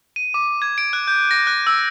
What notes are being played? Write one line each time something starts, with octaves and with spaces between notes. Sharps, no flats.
D#7
D6
G#6
D7
F#6
G6
A#6
F#6
E6